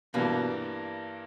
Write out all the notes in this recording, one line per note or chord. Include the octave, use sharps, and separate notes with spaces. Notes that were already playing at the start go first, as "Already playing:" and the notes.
G2 B2 E3 G3 A#3 B3